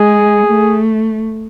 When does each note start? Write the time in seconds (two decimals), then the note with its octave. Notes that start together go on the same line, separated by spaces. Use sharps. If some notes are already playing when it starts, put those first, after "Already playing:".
Already playing: G#3 G#4
0.47 A3